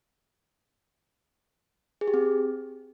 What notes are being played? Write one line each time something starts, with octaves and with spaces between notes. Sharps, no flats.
G#4
G4
C4